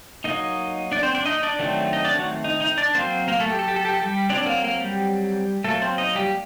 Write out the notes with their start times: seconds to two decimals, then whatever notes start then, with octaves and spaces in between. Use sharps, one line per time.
0.24 F#3 A#3 D#4 D#5
0.92 D4 D5
1.03 C4 C5
1.15 D4 D5
1.26 D#4 D#5
1.43 D4 D5
1.59 D#3 F#3 A3 C4
1.93 D#4 D#5
2.05 D4 D5
2.15 F#3 F#4
2.44 D#4
2.61 D#4
2.78 D4 D5
2.95 F#3 A#3 C4 C5
3.28 A#3 A#4
3.40 A3 A4
3.51 G4
3.59 A4
3.68 G4
3.76 A4
3.85 G4
3.94 A4
4.01 G3 G4
4.29 F#3 C4 D4 D5
4.46 A#3 A#4
4.64 A#3 A#4
4.81 G3 G4
5.64 F#3 A3 A#3 A4
5.82 C4 C5
5.98 D#4 D#5
6.15 G3 G4